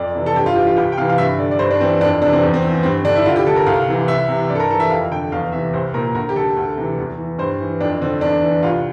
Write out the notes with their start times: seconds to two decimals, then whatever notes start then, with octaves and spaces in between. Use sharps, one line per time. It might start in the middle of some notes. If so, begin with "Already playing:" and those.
Already playing: F2 D5
0.15 C3 E3
0.26 A4
0.36 G2 G4
0.46 F4
0.56 E3 G4
0.67 F4
0.77 C2 G4
0.92 G5
0.98 C3 E3 F5
1.09 F5
1.18 G2 E5
1.38 D3 D5
1.51 D5
1.59 G2 C5
1.71 D4
1.80 E3 C4
2.01 F2 D4
2.21 C3 E3 D4
2.33 C4
2.42 E2
2.54 C4
2.63 E3
2.83 G2 C4
3.04 D3 D4
3.16 E4
3.25 D2 F4
3.36 G4
3.46 D3 A4
3.56 A#4
3.66 C2 F5
3.88 C3 E3
4.08 C2 E5
4.29 C3 E3
4.50 G2 D5
4.55 A4
4.60 A#4
4.69 E3 A4
4.80 E5
4.90 F2 F5
5.11 D3 G5
5.32 E2 F5
5.52 C3 E3 E5
5.73 C2 C5
5.94 A#2 A#4
6.14 D2 A#4
6.29 G4
6.36 D3 A4
6.57 D2
6.77 C3 E3
6.98 E2
7.18 E3
7.38 G2 C5
7.60 E3
7.81 F2 D4
8.01 D3 C4
8.21 E2 D4
8.42 E3
8.63 C2 F4